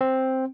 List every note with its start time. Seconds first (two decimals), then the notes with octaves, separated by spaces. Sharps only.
0.01 C4